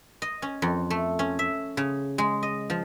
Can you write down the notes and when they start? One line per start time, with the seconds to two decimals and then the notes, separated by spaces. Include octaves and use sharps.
0.22 D#5
0.42 C#4
0.62 F2
0.90 A3
1.19 C#4
1.39 E5
1.77 C#3
2.18 G#3
2.43 D#5
2.70 F3